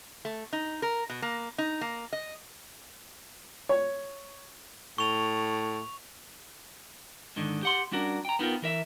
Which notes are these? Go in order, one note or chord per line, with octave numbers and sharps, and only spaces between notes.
A3
D#4
A#4
B2
A#3
D#4
A#3
D#5
C#5
A2 C#6 F7
G#2 D3 D#3
G4 F#5 C6
G3 C#4 D4 F#4 A#4
G5 A#5
B3 D#4 F4 A#4 G5
E3 A#4 E5